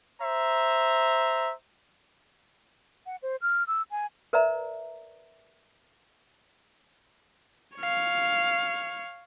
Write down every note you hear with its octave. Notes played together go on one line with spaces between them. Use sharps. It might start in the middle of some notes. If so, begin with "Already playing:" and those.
C5 E5 A#5
F#5
C5
F6
E6
G#5
A#4 B4 D5 E5 A#5
C#5 F5